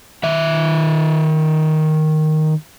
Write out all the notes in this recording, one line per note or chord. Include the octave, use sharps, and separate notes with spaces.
D#3 E5